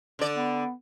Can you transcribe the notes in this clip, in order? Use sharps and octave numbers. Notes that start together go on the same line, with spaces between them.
D3 D5
B3